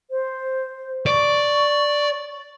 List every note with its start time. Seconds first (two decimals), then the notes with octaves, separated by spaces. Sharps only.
0.11 C5
1.06 D5 C#6